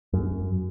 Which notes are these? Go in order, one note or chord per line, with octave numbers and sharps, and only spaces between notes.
F#2